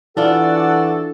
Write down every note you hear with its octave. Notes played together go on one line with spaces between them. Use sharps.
E3 D4 F4 F#4 A4 D5 F#5